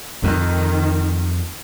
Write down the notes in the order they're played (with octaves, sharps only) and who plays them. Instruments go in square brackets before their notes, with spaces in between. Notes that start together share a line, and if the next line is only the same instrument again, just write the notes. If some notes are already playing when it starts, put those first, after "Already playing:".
[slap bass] F2 [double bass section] D#3